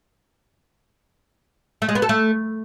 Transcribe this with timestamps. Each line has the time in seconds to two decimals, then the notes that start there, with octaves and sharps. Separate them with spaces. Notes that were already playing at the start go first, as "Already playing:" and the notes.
1.82 A3
1.89 G#3
1.95 B3
2.02 A4
2.09 A3